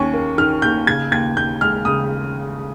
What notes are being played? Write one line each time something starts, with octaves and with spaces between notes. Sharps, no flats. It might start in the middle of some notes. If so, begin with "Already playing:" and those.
Already playing: D#2 D#3 C#4 C#6
A#3
D#3 F6
D#2 G6
C#3 G#6
D#2 G#6
D#2 G6
G#3 F6
C#3 D#6